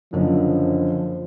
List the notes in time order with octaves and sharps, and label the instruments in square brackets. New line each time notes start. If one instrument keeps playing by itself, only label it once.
[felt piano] F#1 F#2 D3 [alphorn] F3